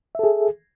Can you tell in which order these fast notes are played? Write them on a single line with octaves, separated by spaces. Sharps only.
E5 A4 G#4